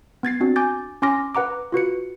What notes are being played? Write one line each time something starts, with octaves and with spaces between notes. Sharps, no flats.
B3 G#6 A6 C7
C4 D4 F#4
G#5 D6 G6 A6
C#4 G#5 C6 D6 F6 A#6
B4 F#5 A#5 D6
F4 F#4 B4 C#7